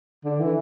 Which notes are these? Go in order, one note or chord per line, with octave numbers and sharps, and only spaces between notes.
D3
E3